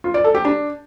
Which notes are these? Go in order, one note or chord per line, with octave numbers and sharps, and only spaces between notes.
F4
D5
A4
G4
D4